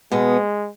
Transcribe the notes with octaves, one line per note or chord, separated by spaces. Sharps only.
B2 G#3 B3